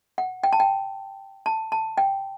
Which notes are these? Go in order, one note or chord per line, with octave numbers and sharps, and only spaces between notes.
F#5
G5
A5
G5
A5
A5
G5